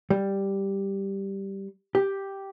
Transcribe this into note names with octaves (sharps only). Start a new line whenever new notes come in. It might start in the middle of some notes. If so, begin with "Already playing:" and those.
G3
G4